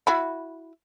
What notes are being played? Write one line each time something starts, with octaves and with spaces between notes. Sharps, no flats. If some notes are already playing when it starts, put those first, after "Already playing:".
E4 F#4 B5